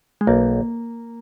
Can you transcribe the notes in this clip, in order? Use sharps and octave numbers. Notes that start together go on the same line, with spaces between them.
G#3
B1 A#3